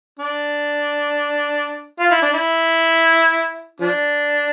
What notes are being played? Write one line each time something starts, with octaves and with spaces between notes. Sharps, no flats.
D4
F4
E4
D4
E4
F3 D4